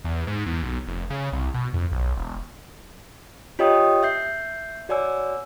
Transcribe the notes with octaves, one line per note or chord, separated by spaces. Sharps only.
E2
G#2
E2
B1
F1
C#3
C2
B2
F2
B1
E1
F4 G4 C#5 D#5 G5 D#6
E5 G6 C7
F#4 C#5 D5 G#5 E6